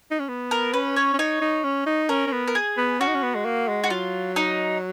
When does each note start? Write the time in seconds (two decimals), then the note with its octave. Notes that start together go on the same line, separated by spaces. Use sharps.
0.11 D#4
0.20 C#4
0.28 B3
0.51 A#4
0.74 C#4 B4
0.96 C#5
1.14 C#4
1.19 D#4 C#5
1.41 D#4
1.64 C#4
1.86 D#4
2.09 C#4 A#4
2.27 C#4
2.32 B3
2.48 A#4
2.55 G#4
2.77 B3
3.00 C#4 F#4
3.08 D#4
3.14 C#4
3.23 B3
3.35 G#3
3.45 A#3
3.68 G#3
3.84 F#4
3.90 F#3 F4
4.36 D#4